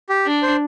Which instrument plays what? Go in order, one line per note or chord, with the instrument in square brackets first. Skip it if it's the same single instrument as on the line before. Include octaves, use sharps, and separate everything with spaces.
[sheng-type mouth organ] G4
[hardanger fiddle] D4
[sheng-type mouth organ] C5